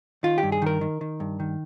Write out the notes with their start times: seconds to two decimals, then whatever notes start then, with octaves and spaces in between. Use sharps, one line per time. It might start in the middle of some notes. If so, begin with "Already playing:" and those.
0.23 D#3 F4
0.38 G4
0.43 G2
0.52 G#4
0.62 D#3 A#4
0.81 D#3
1.01 D#3
1.20 G2
1.40 D#3